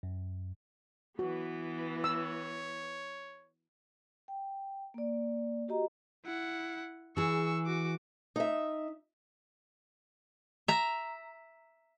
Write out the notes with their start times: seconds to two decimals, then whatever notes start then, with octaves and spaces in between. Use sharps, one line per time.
0.03 F#2
1.19 E3 B3 F#4
2.04 C#5 E6
4.28 G5
4.94 A#3 D5
5.68 F#4 G4 D#5 A#5
6.24 E4 F#5
7.17 E3 G#4 C#6 E6
7.66 F#4 D6
8.36 D#4 E5
10.68 E5 A#5